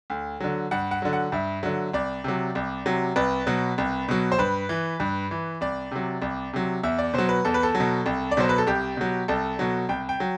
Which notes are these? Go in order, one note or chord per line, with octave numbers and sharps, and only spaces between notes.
D2
D3 F#3
G2 F#5
F#5
D3 F#3
F#5
G2 E5
D3 F#3
C2 D5
C3 F#3
C2
C3 F#3
C2 B4
B2 F#3
C2
B2 F#3
C5
G2 B4
E3
G2
E3
C2 D5
C3 F#3
C2
C3 F#3
E2 E5
D5
B2 F#3 C5
B4
E2 A4
B4
A4
F#3
B2
C2
D5
B2 F#3 C5
B4
A4
C2 G4
B2 F#3
C2 A4
B2 F#3
C2 G5
G5
F#3